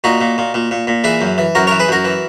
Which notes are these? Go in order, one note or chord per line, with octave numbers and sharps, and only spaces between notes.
A#2 D#4 F#4
A#2
A#2
A#2
A#2
A#2
E3 E4 G#4
F#2
E3
F#2 F#4 A#4
E3 A#4 C#5
G#4 B4
F#2 F#4 A#4
E3